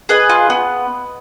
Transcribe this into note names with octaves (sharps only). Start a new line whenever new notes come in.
G#4 B4 D#5
F4
B3